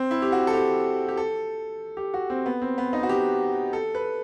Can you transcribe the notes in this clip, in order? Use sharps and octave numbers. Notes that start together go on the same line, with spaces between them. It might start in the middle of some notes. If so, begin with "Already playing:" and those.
Already playing: C4
E4
G4
F#4
A4
G4
G4
A4
G4
F#4
C4
B3
C4
B3
D#4
F#4
G4
A4
B4